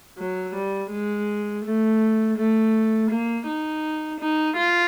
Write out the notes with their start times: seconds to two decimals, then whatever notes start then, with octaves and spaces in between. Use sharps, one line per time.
0.18 F#3
0.55 G3
0.91 G#3
1.65 A3
2.37 A3
3.10 A#3
3.46 D#4
4.20 D#4
4.56 F4